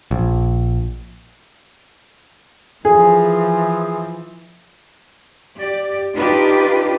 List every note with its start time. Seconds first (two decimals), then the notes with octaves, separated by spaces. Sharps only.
0.11 A#1
2.85 E3 F3 G#4
5.58 G4 D5
6.15 D4 D#4 F4 G4 B4